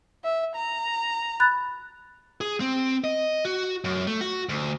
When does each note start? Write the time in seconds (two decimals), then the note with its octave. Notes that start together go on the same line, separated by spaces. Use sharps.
0.24 E5
0.55 A#5
1.40 B5 F#6 A6
2.41 G#4
2.60 C4
3.04 D#5
3.45 F#4
3.84 F#2
4.07 A3
4.21 F#4
4.49 D2